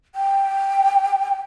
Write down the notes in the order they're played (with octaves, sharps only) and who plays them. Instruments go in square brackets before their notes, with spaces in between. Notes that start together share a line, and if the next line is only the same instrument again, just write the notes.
[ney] G5